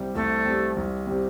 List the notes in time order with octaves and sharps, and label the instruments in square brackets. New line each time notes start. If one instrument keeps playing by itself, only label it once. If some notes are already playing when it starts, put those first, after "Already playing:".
Already playing: [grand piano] C2 C3 G3
[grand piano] C2 [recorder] A3
[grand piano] C3
G3
C2
C3 G3